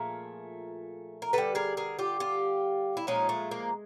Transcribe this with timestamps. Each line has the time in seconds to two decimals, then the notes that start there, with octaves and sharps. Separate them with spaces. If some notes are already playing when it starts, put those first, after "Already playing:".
Already playing: A#2 F3 A3 G#4 A#4
1.22 A#4
1.33 D3 G3 A4 B4
1.55 G#4 A#4
1.77 G#4 A#4
1.99 F4 G4
2.20 F4 G4
2.97 E4
3.07 A#2 F3 G#3 C#4 D#4
3.29 A3
3.51 A#3